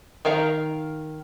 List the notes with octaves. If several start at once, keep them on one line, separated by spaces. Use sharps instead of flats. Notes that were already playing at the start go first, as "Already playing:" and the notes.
D#3 A#4 F5 A#5